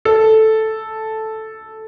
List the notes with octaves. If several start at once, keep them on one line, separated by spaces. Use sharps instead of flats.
A4